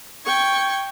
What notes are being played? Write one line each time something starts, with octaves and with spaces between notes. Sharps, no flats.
G5 C#6 G#6